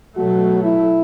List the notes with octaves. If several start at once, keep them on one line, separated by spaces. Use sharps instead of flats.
B2 F#3 A3 F#4
E4